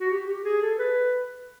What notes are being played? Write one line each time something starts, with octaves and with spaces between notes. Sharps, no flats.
F#4
G4
G4
G#4
A4
B4